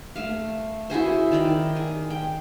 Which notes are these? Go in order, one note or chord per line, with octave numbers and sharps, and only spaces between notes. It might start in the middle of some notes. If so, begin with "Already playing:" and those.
A3 F5
E4 F#4 G#4 C5
D#3 D5 G5
G#4
G5